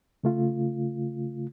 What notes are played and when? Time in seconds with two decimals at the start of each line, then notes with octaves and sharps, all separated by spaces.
0.24 C#3 A3 F4